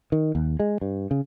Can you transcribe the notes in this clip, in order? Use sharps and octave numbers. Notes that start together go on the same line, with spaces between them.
D#3
D#2
G#3
G2
C#3